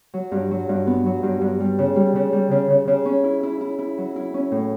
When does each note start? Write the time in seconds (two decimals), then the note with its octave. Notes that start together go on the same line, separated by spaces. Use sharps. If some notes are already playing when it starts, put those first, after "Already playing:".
0.14 F#3
0.32 G2
0.51 F#3
0.69 G2
0.87 B3
1.06 F#3
1.23 G2
1.41 G2
1.60 G3
1.79 C#3
1.96 G3
2.15 C#3
2.33 G3
2.51 C#3
2.70 C#3
2.88 C#3
3.06 C#4
3.24 E4
3.43 E4
3.61 E4
3.79 E4
3.98 F#3
4.16 E4
4.34 C#4
4.52 A2